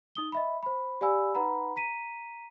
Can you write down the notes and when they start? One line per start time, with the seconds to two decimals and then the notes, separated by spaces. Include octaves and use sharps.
0.15 D#4 D#6 G7
0.32 D#5 E5 B5
0.63 C5 B5
1.01 G4 D5 F5 G#5 B5 E6
1.35 D#4 B4 F#5 A#5 B5
1.76 A#5 B6 D#7